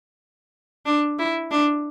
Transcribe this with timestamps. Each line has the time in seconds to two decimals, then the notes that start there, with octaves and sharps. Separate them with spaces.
0.86 D4
1.19 E4
1.51 D4